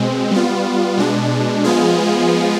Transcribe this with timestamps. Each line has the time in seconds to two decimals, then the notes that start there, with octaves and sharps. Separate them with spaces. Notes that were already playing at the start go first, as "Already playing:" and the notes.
Already playing: B2 G#3 C4
0.31 G3 B3 F4
0.97 B2 G#3 D4
1.64 F3 G#3 B3 F4 G#4